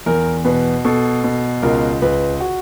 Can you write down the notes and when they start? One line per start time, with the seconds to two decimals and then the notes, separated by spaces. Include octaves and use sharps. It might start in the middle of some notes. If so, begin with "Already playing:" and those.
0.06 E2 A#4
0.45 B2 B4
0.85 B2 A4
1.24 B2
1.62 C#2 A#4
2.02 C#2 B4
2.41 F#4